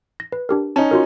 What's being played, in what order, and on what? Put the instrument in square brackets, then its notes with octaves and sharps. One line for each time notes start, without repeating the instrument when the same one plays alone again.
[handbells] A#6
B4
D4 G4 A#4
[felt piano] C#4 D#4 [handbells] A5
[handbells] F4 F#4 A#4